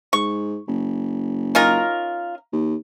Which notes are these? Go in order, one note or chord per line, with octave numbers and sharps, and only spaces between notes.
G#2 C#6
F#1
C#4 D#4 F4 A#4 A#5
D#2